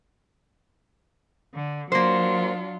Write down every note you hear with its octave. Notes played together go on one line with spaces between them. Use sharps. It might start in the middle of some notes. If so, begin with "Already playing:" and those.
D3
F#3 A#3 D4 F4 C5